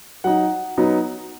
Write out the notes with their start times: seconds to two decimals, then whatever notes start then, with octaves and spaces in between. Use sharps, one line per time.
0.24 F#3 D#4 F#5
0.78 F#3 B3 D#4